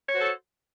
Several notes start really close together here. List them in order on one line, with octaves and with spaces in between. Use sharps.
C#5 F#4 C5 A4